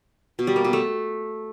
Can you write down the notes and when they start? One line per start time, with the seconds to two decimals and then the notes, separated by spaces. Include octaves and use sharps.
0.39 B2
0.47 G3
0.56 A#3
0.64 B2
0.73 A3